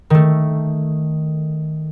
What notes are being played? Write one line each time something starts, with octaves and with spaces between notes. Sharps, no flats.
D#3 A3